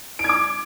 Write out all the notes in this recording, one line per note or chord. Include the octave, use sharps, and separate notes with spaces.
D7
G#6
D6